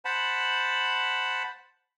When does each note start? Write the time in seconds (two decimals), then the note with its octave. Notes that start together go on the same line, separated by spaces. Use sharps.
0.05 C5 F#5 A5 B5